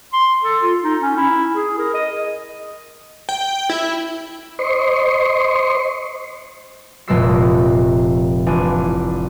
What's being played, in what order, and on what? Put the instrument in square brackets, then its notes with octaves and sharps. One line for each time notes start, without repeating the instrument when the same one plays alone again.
[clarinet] C6
A4
F4
D#4
C#4
E4
G#4
A#4
D#5
[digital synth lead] G5
E4
[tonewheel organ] C5 D#5 C6 C#6
[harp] F1 A#2 G#3 A4 E6 C7
A1 D4 F4 G#5